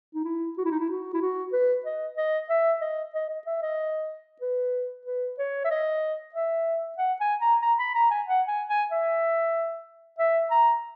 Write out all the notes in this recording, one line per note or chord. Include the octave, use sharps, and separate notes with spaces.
D#4
E4
F#4
E4
D#4
E4
F#4
E4
F#4
B4
D#5
D#5
E5
D#5
D#5
D#5
E5
D#5
B4
B4
C#5
E5
D#5
E5
F#5
G#5
A#5
A#5
B5
A#5
G#5
F#5
G#5
G#5
E5
E5
A#5